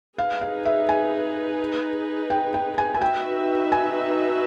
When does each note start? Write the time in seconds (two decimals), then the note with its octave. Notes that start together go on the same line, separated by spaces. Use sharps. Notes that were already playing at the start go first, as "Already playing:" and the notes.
0.18 D#4 G#4 B4 F5
0.41 F5
0.65 E5
0.89 G#5
2.30 G5
2.54 G5
2.78 G#5
2.94 G#5
3.01 D#4 F#4 B4 E5 G5
3.72 G#5